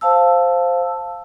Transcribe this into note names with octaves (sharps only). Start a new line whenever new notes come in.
C5 F5 A5 E6